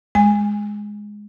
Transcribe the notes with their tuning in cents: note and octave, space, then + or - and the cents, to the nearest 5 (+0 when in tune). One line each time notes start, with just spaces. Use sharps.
G#3 +0 G#5 -20